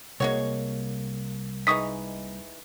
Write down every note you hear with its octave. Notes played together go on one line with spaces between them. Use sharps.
C2 G#3 A#3 F#4 C#5
E3 G#3 D#4 C#6 D#6 B6